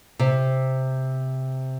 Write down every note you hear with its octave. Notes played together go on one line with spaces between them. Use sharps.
C3